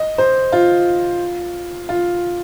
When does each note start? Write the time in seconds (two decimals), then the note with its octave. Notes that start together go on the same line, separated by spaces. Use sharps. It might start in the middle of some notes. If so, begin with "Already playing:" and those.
Already playing: D#5
0.18 C5
0.53 F4
1.89 F4